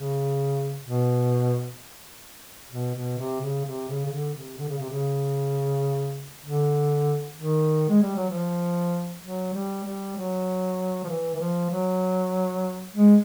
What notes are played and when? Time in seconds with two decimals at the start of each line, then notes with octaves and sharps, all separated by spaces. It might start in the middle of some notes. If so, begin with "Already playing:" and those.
Already playing: C#3
0.86 B2
2.71 B2
2.94 B2
3.18 C3
3.41 C#3
3.65 C3
3.88 C#3
4.06 C#3
4.12 D3
4.35 C3
4.58 D3
4.68 C#3
4.79 C3
4.89 C#3
6.44 D3
7.37 D#3
7.89 G#3
8.02 G3
8.16 F#3
8.30 F3
9.23 F#3
9.53 G3
9.84 G3
10.16 F#3
11.04 F3
11.09 E3
11.35 E3
11.40 F3
11.71 F#3
12.94 G#3